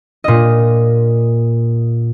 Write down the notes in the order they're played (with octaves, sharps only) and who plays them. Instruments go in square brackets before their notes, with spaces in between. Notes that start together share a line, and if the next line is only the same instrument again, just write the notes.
[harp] A#2 D#5